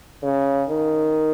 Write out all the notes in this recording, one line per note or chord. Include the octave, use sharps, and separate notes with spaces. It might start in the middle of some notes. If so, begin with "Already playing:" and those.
C#3
D#3